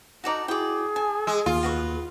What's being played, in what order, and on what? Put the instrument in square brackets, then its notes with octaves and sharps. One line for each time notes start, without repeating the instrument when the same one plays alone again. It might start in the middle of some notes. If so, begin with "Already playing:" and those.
[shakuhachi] D#4 [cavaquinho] F#4 A4 D5 [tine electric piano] F#5 A#5
[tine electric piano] E4 F#4 [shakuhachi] G#4 [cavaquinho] D5 G5
[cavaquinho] G#5 [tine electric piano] A5
[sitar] G#3 [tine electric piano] E6
[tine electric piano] D#2 [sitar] F4
[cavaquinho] F#4 B4 C#6